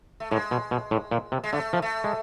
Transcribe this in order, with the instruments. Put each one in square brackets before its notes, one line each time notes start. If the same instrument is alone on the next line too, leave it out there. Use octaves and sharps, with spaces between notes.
[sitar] A3
[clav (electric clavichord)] A2 [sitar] G#3
[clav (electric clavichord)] B2
B2
A2
A#2
C3
[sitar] G#3
[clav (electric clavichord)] D3 [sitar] A3
[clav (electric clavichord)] F3
[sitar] A3
[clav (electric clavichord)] G#3